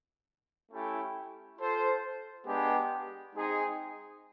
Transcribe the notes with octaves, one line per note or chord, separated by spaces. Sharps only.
A3 C#4 E4 G4
F4 A4 C5
G#3 B3 D4 G4
G#3 C4 D#4 G#4